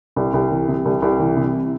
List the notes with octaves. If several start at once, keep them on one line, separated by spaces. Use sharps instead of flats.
C2
C2
E3
C3
C2
C2
E3
C3